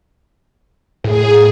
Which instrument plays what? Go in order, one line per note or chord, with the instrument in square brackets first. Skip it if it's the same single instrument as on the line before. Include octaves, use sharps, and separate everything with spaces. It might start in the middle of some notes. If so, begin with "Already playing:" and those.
[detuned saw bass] A2 [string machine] G#4